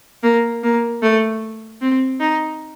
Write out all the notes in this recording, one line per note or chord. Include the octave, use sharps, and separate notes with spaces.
A#3
A#3
A3
C4
D#4